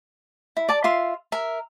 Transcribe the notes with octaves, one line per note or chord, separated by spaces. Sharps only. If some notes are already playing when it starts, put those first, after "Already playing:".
E4
D5 A5 D6
F4 E5 C6
A#4 E5